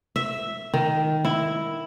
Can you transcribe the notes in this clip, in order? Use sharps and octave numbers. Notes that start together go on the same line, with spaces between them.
E5
D#3
E4